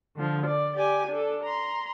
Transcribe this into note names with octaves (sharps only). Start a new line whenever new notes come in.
D3 F3
D5
G4 D5 G#5
D4 A4
A#5 C6